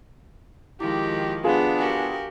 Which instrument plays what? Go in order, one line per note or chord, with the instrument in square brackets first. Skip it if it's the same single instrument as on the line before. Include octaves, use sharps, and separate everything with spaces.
[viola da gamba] D#3 F3 G#3 [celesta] E4 D6 [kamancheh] G4
[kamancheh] B3 D4 [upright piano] F4 G#4 [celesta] G4 F5
[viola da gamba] F#4 G4 A#4 [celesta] F5 G5 G#5